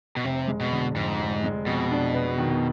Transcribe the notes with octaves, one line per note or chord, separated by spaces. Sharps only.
B2
F1 C3
G#3
B2
D3
F2 G#2
F1
G#3
F2 B2
D4
B3
D#3